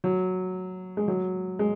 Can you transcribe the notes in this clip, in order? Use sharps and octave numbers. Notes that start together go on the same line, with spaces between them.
F#3
G#3
F#3
G#3